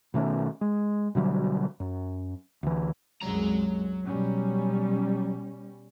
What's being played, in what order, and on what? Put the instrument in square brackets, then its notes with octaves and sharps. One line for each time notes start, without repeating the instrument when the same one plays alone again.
[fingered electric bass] B2 D#3 A3 C#4
G#3
B2 D3 F#3 G3
F#2
D2 E3
[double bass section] C2 F#2 G#3 [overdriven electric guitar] F#3 A#5
[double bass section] B2 G3 C#4